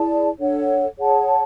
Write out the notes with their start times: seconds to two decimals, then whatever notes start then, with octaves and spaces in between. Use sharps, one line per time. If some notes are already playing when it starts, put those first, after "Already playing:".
Already playing: E4 G#4 D5 A5
0.39 D4 A4 C#5 F#5
0.97 G#4 C#5 F#5 A5